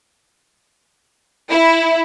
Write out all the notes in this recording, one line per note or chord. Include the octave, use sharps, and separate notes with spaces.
E4